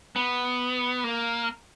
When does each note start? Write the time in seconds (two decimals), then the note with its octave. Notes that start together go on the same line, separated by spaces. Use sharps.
0.16 B3
1.04 A#3